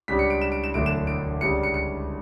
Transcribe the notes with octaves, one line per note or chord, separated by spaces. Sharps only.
C#2 C#3 G3 D4 B6
C#7
D7
E7
D7
E7
E1 D2 D3 F#3 A3 D7
E7
D7
C#2 C#3 G3 D4 C#7
C#7
C#7